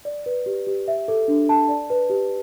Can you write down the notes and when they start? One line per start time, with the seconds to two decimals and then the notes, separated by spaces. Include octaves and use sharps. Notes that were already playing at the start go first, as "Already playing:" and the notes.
0.05 D5
0.26 B4
0.46 G4
0.67 G4
0.88 E5
1.08 A4
1.28 D4
1.49 A5
1.69 D5
1.90 B4
2.10 G4